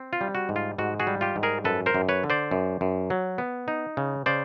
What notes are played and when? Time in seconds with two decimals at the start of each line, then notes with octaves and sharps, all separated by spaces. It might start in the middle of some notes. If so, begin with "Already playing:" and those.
Already playing: C4
0.13 F4
0.21 G3
0.35 F#4
0.49 G#2
0.56 F4
0.78 G#2 F#4
1.00 F#4 G#4
1.07 G3
1.21 F4 G4
1.36 G#2
1.43 G#4 A#4
1.64 F#2 A4 B4
1.86 A#4 C5
1.95 F#2
2.09 B4 C#5
2.24 D3
2.30 C5 D5
2.51 F#2
2.81 F#2
3.10 F#3
3.38 B3
3.68 D#4
3.97 C#3
4.26 C#3 C5 D5